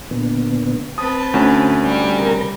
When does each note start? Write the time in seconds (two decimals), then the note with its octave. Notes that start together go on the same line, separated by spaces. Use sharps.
0.11 A#2 D3 B3
0.98 C4 B4 A5 D#6
1.34 D2 C#4
1.82 G3
2.19 C3 A#4 A#5